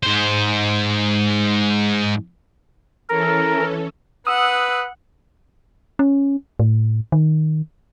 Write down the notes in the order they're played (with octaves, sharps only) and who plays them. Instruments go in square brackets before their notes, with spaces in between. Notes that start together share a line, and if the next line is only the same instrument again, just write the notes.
[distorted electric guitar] G#2 C5
[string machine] E3 C#4 A4 [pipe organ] A#4
[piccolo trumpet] B4 [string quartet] F#5 [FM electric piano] D#6 E6
[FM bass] C#4
A2
D#3